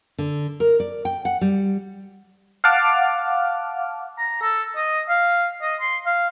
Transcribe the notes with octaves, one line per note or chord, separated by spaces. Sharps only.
D3
A#4
D5
G5
F#5
G3
F5 F#5 A5 D6 F6
A#5
A4
D#5
F5
D#5
C6
F5